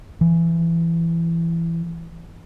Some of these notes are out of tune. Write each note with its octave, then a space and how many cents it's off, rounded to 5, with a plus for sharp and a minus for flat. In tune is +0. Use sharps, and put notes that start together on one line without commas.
E3 +20